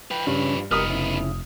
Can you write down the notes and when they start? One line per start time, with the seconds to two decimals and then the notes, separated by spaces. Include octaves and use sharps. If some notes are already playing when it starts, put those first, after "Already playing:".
0.11 F3 B4 G5
0.27 G2 C#3 C#4
0.71 F1 G3 B3 D#4 A#4 D#6 F6
0.90 C#3 E4